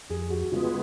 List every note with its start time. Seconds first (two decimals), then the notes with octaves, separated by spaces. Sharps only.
0.10 F2 G#4
0.30 F#4
0.52 C#3 G#3 B3 F4